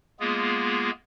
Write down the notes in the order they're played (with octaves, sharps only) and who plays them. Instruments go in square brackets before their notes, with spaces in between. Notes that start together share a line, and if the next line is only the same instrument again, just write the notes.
[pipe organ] G#3 A#3 B3 F4 G#4